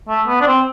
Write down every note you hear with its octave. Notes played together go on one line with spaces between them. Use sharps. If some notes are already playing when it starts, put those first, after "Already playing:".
A3
B3
D4
C4